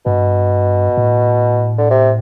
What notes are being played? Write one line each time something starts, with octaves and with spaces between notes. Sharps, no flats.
G2 B2
A2
D3
C3